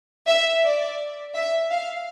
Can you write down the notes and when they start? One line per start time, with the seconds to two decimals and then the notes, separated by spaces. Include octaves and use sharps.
0.27 E5
0.63 D5
1.34 E5
1.70 F5